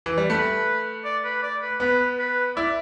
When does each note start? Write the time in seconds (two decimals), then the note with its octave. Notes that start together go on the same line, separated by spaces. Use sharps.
0.06 E3
0.18 G3
0.30 A3 B4
1.04 D5
1.24 B4
1.42 D5
1.62 B4
1.80 B3 B4
2.19 B4
2.56 E4 D5